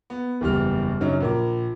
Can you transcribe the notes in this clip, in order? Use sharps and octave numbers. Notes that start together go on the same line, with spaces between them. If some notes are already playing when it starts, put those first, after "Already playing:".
B3
F#1 E2 G3 G4 F6
F#2 C#3 F#3 D4 D#4
A#1 A#4 D6